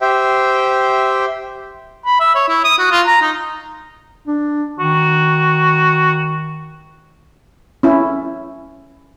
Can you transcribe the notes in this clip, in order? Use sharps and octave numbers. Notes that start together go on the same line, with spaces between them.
G4 C5 E5 G5
B5
E5
C#5
E4
D#6
F#4
F4
A#5
D#4
D4
D#3 F#4
C#4 E4